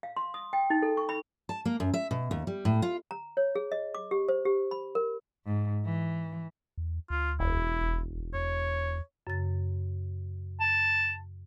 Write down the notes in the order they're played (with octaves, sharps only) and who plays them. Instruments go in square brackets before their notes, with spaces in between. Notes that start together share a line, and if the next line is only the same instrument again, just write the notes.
[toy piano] F5
C6
D#6
G5
D#4
A4
C#6
B5
[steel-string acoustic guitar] A5
A#3
F#2
E5
B2
D#2
G3
A2
F4
[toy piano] A#5
C#5
G#4
D#5
D6
G4
C5
G4
B5
A#4
[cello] G#2
E3
[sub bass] E2
[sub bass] D2 [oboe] F4
[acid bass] E1 [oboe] E4
[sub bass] F1
[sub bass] E2 [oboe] C#5
[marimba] F#2 C#3 A6
[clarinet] A5